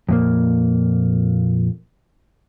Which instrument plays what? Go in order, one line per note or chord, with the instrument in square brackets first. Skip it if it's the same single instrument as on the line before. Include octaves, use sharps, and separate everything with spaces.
[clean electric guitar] F2 A#2 A#3